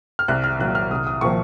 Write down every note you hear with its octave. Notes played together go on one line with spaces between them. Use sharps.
F6
C2 F#6
F6
A#2 F#3 F#6
F6
C2 D#6
D#6
A#2 F3 C#6